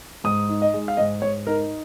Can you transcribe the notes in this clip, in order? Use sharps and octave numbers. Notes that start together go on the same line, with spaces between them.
G#2 D#6
D#4
D#5
G#3
F5
G#2 D#5
G#2 C#5
D#4 A#4